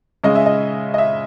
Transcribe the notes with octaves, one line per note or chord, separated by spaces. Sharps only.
C#3 G#3 D#5
E5
D#5
D#5
E5